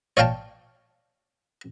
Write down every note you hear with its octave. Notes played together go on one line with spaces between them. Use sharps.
C#5 D5 F5 G5 A5